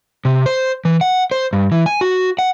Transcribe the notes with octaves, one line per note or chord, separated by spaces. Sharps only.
C3
C5
E3
F#5
C5
G2
E3
G#5
F#4
F#5